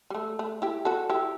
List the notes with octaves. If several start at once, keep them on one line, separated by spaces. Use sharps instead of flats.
G3
A3
A3
E4 G4
F#4 A4
E4 G4